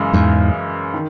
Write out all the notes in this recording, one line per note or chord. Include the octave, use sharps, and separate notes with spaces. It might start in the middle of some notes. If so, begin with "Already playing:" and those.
Already playing: F#2 C#3 E3 G#3
E2 G#2
D#3